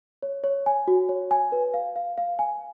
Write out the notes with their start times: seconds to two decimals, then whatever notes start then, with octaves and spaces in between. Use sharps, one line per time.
0.23 C#5
0.44 C#5
0.66 G#5
0.88 F#4
1.09 C#5
1.31 G#5
1.52 B4
1.74 F5
1.96 F5
2.18 F5
2.39 G#5